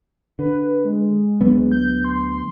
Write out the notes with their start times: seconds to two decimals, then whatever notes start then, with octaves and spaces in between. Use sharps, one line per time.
0.39 D3 B4
0.85 G#3
1.41 D2 F#3 B3
1.72 G6
2.05 C6